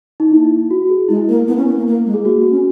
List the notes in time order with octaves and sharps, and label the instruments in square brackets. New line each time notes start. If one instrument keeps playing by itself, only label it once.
[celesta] D#4
[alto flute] A#3 [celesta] E4
[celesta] F#4
G#4
[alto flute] G#3 [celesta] E4
[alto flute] A#3 [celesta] A#4
[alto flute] B3 [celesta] E4
[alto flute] C#4
B3
A#3
A#3
G#3
[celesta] G#4
[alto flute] A#3 [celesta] F#4
[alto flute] A#3
C#4